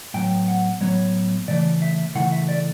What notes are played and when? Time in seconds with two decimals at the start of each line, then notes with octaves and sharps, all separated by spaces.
0.14 A2 F#3 B3 G5
0.48 F#5
0.81 A2 F#3 B3 C#5
1.48 C#3 E3 A3 D5
1.82 E5
2.15 C#3 E3 A3 F#5
2.32 E5
2.49 D5